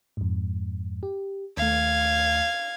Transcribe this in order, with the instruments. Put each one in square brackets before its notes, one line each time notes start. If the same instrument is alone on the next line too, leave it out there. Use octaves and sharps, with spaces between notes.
[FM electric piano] F2 G#2
G4
[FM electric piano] D#2 A3 [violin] F5 G#6